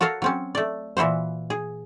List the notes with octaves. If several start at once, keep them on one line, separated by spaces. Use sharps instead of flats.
F#4 A4 A#4 C#5 F5
F#3 C4 C#4
A3 D5
A#2 E3 E4 F#4 C5
G#4